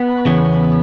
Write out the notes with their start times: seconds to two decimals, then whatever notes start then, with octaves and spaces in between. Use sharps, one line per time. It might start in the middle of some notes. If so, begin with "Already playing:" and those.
Already playing: B3
0.25 E2 C#3 E3 C#4